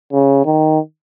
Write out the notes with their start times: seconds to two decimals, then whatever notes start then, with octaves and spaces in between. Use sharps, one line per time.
0.13 C#3
0.45 D#3